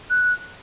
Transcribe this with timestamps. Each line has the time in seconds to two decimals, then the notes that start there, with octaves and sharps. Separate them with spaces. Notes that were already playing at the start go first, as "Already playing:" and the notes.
0.10 F#6